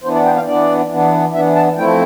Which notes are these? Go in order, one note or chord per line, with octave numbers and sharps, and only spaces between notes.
E3 B3 D4 C5
D5
G5
F5
E3 B3 D4 D5
E3 B3 D4
E3 B3 D4 E5
A5
F3 A3 C4 E4 G5